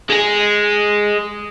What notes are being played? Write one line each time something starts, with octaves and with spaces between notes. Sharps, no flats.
G#3 G#4